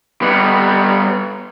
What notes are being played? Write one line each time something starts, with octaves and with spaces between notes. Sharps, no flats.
G3 B3